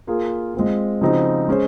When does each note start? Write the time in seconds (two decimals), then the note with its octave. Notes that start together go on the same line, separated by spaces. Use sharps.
0.07 A#3 F4 G#4
0.55 G#3 C4 F4
1.01 C#3 F3 C4 D#4 F#4
1.48 G#3 C#4 G#4 C5